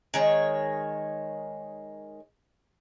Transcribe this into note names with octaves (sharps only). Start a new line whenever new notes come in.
D#3 G#3 C#5